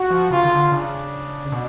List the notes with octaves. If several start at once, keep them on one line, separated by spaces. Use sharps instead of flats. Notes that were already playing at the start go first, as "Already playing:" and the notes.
Already playing: F#4
F3
C#3 F4
D#3
D3
C#3 D4
B2